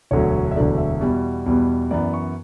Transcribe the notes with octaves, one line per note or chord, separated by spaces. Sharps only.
E1 D2 D3 F#3 C#5
E5
E1 D2 D3 F#3 D5
E5
E2 B2 G3 B3
E2 B2 G3 B3
F#2 E3 B3 D5
C#6